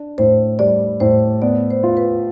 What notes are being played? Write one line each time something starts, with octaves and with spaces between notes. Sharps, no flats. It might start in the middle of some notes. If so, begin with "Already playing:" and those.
Already playing: D4
A2 C5
G3 D5
A2 C5
B3 D5
C5
F4
B4